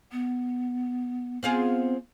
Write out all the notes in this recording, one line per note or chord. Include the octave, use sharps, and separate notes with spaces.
B3
B3 C4 F4 G#4